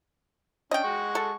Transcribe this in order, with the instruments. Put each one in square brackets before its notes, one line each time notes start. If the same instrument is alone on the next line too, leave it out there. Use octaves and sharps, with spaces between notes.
[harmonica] C#4 D4 [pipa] D#5 G5
[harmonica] G#3 F#5 C#6
[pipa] A4